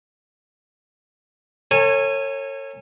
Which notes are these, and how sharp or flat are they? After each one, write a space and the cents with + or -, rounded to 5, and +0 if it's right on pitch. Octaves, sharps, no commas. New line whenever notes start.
A4 +40 C#5 -20 G#5 -10